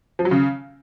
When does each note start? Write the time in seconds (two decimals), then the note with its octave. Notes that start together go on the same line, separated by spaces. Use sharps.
0.19 F3
0.25 F#3
0.31 C#3